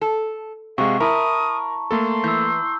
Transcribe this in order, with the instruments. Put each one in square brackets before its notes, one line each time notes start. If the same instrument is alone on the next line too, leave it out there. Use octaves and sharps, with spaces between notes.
[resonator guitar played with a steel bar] A4
[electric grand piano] C3 G#3 [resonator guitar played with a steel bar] F#4 [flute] F5 [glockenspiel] C#6
[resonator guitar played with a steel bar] E4 [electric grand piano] A#4 [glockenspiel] A5 A#5 [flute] D#6
[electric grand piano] A3 A#3 A4 [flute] C6
[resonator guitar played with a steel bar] E3 [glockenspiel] E6 G6